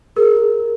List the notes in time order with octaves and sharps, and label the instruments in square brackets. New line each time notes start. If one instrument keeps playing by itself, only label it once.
[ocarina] G#4 [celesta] A#4